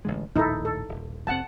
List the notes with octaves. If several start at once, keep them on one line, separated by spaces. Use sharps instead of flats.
A1 D3 G#3
A#1 D#2 A2 D#4 E4 A4
A4
D#1
F1 A#2 C4 F#5 A5